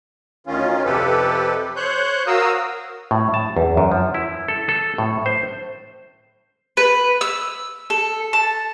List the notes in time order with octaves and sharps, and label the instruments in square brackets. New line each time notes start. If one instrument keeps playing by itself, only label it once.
[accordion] D2 D#3 C#4 F4
F2 C3 G4 A4 B4
C5 C#5 F#6 G6
F#4 A#4 F5 D#6 E6
[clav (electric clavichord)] A2
A5
E2
F#2
F3
E4
A4
A4
A2
C5
[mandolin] B4
E6
A4
A5